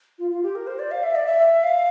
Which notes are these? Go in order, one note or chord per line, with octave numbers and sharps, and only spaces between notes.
F4
F4
G4
A#4
C5
D5
F5
E5
D5
E5
F5